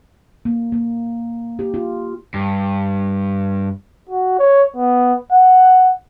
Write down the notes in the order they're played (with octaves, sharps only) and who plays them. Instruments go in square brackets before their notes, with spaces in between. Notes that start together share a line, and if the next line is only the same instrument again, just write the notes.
[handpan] A#3
A#3
G4
F4
[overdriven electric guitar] G2
[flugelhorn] F#4
C#5
B3
F#5